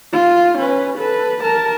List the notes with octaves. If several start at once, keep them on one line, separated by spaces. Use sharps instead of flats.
F4
C#4 B4
A4 B4
A#4 A5